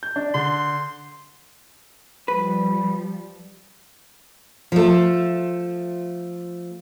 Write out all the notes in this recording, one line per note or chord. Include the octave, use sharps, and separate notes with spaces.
G6
D4
D3 C6
F3 G3 B4
F3 A3